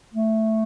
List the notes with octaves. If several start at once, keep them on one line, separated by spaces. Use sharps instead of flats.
A3